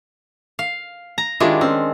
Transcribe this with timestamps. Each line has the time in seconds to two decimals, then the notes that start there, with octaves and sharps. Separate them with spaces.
0.59 F5
1.18 A#5
1.40 D#3 G#3 D4 E4 F4 G4
1.61 C4 C#4